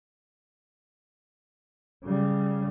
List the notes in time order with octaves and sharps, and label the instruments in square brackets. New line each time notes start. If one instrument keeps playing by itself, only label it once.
[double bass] C#3 G3